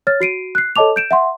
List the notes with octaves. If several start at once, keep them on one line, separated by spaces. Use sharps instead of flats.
C#5 F6 A6
F#4 C7 D7 D#7
F#6 C7
A4 C#5 D#5 A5 D6 F7
G6 D7 E7
E5 F#5 C6